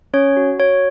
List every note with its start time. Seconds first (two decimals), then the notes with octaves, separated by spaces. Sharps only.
0.14 C#4 C#5
0.37 F#4
0.59 F#4 C#5